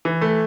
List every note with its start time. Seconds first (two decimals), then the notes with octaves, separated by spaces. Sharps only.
0.05 E3
0.21 A3